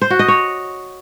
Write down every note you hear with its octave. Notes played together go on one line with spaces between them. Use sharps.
C5
F#4
D#5
C#5